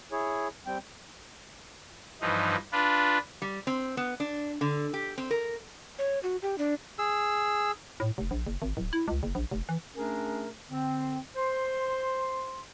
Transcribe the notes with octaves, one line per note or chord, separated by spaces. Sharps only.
E4 G#4 C#5
G3 C4 G5
G2 E3 F3 D#4
D4 F4 B4
G3
C4
B3
D4
D3
G4
C4
A#4
C#5
F#4
G4
D4
G#4 E6
A2
F1
A#1
F#1
G#1
D1
E4
C#2
F#1
A#1
F1
E3
A3 C#4 D4 G#4 A#4
D3 C4
C5 C6